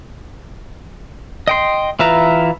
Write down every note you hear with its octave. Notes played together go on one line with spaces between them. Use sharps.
D#5 G5 C6
E3 F4 B4 E5 A#5